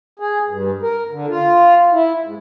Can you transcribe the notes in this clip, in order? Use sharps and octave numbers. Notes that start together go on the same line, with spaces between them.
G#4
G2
A#4
D3
F4
E4
G#2